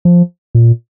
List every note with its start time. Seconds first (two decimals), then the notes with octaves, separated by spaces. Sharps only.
0.05 F3
0.55 A#2